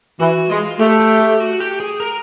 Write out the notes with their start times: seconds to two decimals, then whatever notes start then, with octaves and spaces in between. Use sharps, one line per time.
0.20 E3 F#4
0.49 G#3 F4
0.79 A3 G4
1.00 G4
1.20 G4
1.40 F#4
1.60 G4
1.80 G#4
2.00 A#4